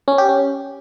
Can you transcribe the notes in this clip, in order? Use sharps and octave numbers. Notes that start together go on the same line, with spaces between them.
C#4
G4
C#4